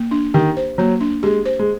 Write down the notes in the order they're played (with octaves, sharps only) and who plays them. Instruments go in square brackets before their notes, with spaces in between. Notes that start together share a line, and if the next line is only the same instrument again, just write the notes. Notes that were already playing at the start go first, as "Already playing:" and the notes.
Already playing: [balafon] A#3
D4
[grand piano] D#3 [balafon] G4
[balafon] C5
[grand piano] F#3 [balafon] A#3
[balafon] D4
[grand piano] G#3 [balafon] G4
[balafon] C5
[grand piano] G#3